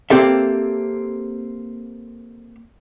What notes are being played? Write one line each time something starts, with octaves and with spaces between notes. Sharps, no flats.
A#3 C4 G4 A4 E5